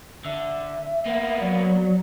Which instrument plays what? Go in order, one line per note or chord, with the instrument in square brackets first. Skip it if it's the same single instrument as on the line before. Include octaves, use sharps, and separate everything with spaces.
[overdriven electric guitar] D3 [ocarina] E5
[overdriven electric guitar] A#3 B3
[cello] F#3 [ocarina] D5